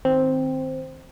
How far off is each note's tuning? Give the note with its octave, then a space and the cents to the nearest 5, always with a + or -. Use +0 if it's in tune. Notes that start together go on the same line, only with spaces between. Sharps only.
D#3 +0 C4 +0